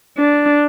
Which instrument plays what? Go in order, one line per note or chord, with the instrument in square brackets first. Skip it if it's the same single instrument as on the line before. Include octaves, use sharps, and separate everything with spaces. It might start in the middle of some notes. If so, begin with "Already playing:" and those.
[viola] D4